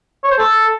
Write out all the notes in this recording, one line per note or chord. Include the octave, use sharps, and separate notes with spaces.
C#5
C5
A4